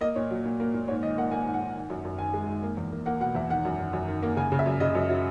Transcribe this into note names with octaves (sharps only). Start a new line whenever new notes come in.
A#3 D#5
A#2 C#5
F#3
A#2
A#3
A#2
G#2 C#5
D#3 D#5
A#3 F#5
A#3 G#5
G#2
F#5
G#2
D#3
F#2
F#2
D#3 G#5
G#3
D#3
A#3
E2
A#3
A#3 F#5
B2 F#5
E2 E5
D#3 F#5
F#2
D#3
F#2
D#3
A#3
C#3 G#5
C#3
E5
F#2
C#3 D#5
F#2
F#3